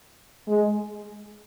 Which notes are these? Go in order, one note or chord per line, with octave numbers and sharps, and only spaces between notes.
G#3